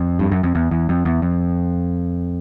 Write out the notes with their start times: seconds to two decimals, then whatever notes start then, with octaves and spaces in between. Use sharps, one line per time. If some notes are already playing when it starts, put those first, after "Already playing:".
Already playing: F2
0.19 G2
0.32 F#2
0.43 F2
0.55 E2
0.71 E2
0.89 F2
1.05 E2
1.22 F2